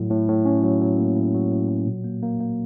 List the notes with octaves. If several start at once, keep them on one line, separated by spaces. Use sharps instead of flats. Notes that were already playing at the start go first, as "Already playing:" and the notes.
Already playing: A2 F#3
A2
A2
C#4
F#3
F#3
A#3
A2
F#3
A2
F#3
A#2
A#3
A#3
A#3